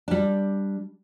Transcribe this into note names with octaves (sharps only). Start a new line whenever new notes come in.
G3 D4